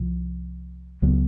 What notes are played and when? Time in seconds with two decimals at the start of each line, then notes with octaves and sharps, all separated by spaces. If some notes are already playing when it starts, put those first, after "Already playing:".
Already playing: C2 C3 F3
1.02 C#2 C#3 F#3 B3